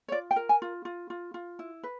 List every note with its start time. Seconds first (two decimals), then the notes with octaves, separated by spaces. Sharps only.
0.08 C#5
0.12 F4 D5
0.31 G5
0.36 A#4
0.49 G#5
0.62 F4
0.85 F4
1.10 F4
1.34 F4
1.59 E4
1.83 B4